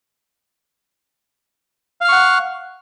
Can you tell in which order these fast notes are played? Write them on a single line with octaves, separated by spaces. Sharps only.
F5 F6 C#6 F#5